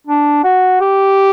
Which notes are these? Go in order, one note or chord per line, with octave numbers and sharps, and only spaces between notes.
D4
F#4
G4